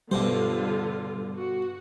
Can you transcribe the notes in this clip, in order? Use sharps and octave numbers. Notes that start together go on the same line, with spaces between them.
G2 B2 D3 G3 F4 C5
F#4